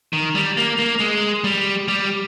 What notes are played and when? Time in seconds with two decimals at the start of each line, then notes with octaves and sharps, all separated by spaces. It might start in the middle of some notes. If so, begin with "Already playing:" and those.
0.13 D#3
0.35 G3
0.57 A#3
0.79 A#3
1.00 G#3
1.44 G3
1.88 G3